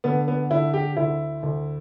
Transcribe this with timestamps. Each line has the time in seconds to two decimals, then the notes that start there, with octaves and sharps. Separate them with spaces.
0.04 D3 B3
0.28 B3
0.51 D3 E4
0.74 G4
0.97 D2 E4
1.43 D2